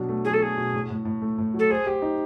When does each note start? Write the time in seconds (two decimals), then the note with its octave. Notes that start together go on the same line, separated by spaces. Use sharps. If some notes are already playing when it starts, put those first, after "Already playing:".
Already playing: B2 F#3 D4
0.09 A3
0.24 F#3 G#4
0.33 A4
0.41 F#3 G#4
0.57 B2
0.73 A2
0.90 A2
1.05 A2
1.22 A3
1.38 A2
1.54 F#3 A4
1.70 G#4 C5
1.87 G4
2.02 D#4